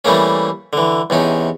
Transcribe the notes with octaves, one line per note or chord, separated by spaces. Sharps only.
E3 G3 A3 A#3 C#4
D3 E3
E2 C3 C#4 D#4